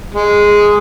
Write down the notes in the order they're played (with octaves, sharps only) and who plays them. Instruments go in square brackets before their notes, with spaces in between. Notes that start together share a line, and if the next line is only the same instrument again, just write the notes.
[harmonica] G#3